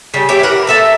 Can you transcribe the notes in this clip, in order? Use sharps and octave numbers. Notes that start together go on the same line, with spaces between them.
C#3 G3
E4 G4 C#5
E3 A#4 F#5
A4 E5 A#5